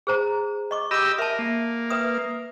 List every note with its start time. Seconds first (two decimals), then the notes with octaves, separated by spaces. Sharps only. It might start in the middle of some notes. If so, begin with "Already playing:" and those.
0.07 G#4 C5 A#5
0.71 D#5 C#6 D6
0.91 G4 D#5 B5 D6 E6
1.18 A#4 E5 A5
1.39 A#3
1.90 B4 E5 D#6